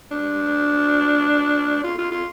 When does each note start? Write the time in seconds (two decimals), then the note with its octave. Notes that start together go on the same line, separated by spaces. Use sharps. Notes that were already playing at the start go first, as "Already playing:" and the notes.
0.11 D4
1.84 F4
1.98 F4
2.11 F4